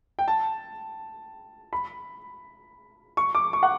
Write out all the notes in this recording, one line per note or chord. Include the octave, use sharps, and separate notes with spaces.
G5
A5
B5
C#6
D6
C#6
F#5